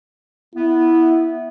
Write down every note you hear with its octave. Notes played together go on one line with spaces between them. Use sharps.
B3 E4